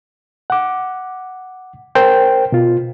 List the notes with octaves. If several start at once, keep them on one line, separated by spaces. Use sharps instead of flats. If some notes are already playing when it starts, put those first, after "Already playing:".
F#5 D6
A#4 C5 G5
B2 F4